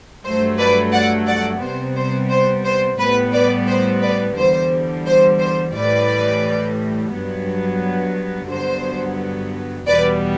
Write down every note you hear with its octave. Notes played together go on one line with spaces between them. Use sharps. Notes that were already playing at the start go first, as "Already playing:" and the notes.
G2 F#3 A3 C5
B4 D5
D5 F#5
D5 F#5
C3 G3 B3 C5
C5
C5
C5
A2 G3 B3 B4
B4 D5
C5
B4 D5
E2 D3 G3 C5
C5
C5
A2 E3 G3 B4 D5
G2 F#3 B3
G2 D3 F#3 B3 C5
E2 B2 G3 B3 B4 D5